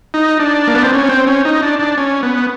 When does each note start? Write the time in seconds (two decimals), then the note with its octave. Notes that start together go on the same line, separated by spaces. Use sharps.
0.14 D#4
0.40 D4
0.67 A#3
0.75 B3
0.83 C4
0.93 C#4
1.09 C4
1.27 C#4
1.45 D#4
1.62 D4
1.79 D4
1.97 C#4
2.23 B3